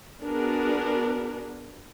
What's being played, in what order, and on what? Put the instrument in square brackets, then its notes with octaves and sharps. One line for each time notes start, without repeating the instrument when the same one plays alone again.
[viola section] B3 D4 F#4 G#4 A#4 B4